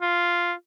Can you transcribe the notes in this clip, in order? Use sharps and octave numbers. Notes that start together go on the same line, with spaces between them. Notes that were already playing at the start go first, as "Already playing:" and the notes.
F4